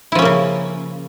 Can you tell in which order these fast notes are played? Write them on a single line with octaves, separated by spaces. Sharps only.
E4 F3 C#4 A#3 C#3